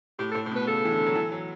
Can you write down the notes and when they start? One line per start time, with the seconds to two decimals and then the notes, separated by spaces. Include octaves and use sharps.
0.19 A2 G4
0.31 A4
0.35 A2
0.46 A2
0.51 B2 B4
0.67 C#3 A4
0.85 E3
0.91 D3
1.06 F#3
1.15 E3
1.32 F#3